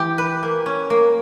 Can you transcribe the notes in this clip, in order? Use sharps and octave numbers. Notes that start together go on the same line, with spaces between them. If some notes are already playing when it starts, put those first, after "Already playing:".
Already playing: E3 G4
B4
A#3
C#4
A#3